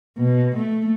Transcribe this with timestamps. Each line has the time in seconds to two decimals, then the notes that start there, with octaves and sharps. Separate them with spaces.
0.18 B2
0.56 A3